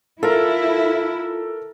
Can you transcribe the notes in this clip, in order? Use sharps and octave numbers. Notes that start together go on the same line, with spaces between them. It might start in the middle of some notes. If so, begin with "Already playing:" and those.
E4 F4 A4 A#4